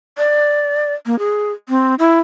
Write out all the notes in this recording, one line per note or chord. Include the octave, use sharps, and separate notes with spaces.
D5
A#3
G#4
C4
E4